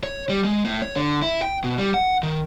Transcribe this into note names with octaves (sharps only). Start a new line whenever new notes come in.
C#5
G3
G#3
A2
C#5
D3
E4
G5
B2
G3
F#5
D#3